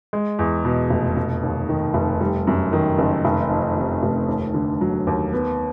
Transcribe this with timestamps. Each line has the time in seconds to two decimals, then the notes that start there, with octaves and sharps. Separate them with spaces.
0.13 G#3
0.39 E2
0.65 B2
0.90 F1
1.17 F1
1.43 D#2
1.69 D#3
1.94 F1
2.21 G3
2.47 F#2
2.73 D#3
2.98 F#1
3.25 F1
3.51 F2
3.77 C3
4.03 F1
4.28 D#2
4.54 D3
4.81 F#3
5.07 D#2
5.33 B3